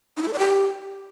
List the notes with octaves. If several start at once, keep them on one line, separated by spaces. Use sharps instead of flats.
D#4
E4
A4
D5
G4